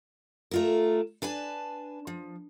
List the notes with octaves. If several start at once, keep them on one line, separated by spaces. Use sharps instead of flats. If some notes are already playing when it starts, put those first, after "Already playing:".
A3 F4 A#4
D4 B4 G#5 A5
F3